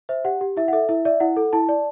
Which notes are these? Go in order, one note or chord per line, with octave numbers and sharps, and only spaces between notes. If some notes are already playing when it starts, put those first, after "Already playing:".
C5 E5
G4 F#5
G4
E4 E5
F#5
A4 E5
E4 E5
D5 E5
E4 F#5
A4
E4 A5
D5